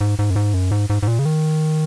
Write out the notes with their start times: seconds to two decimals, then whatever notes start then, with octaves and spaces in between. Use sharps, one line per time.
0.01 G#2
0.19 G#2
0.30 F#2
0.36 G#2
0.54 F#2
0.71 G#2
0.90 G#2
1.03 G#2
1.08 A#2
1.19 C#3
1.25 D#3